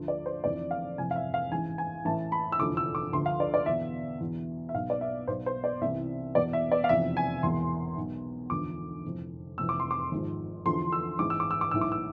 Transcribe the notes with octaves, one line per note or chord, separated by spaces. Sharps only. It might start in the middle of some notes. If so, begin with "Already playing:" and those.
Already playing: D2 D3 F3
D5
C5
F1 F2 C3 E3 D5
F5
F1 F2 C3 E3 G#5
F5
E5
F5
A1 G#2 E3 G#5
G#5
A1 A2 E3 A5
B5
E6
F1 E2 D3 F3 D6
E6
D6
D2 D3 F3 C6
F5
D5
D5
E2 B2 E5
E2 B2
E5
B1 B2 F5
D5
E5
B1 B2 C5
C5
D5
C2 C3 E3 E5
E2 B2 D5
E5
D5
F5
F1 E2 C3 F3 E5
G#5
E1 E2 B2 C6
B1 B2
E1 D2 D3 F3 D6
F1 F2 E3
F1 F2 C3 E3 E6
D6
C6
D6
G#1 G#2 F3
E2 D3 F3 C6
E6
A1 G#2 E3 D6
E6
D6
E6
D6
B1 A2 E3 E6
D6
E6